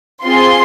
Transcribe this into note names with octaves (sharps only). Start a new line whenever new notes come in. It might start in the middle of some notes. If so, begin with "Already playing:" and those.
C4 F4 G#4 C6